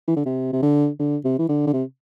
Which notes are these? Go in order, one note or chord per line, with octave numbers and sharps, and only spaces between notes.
E3
D3
C3
C3
D3
D3
C3
E3
D3
D3
C3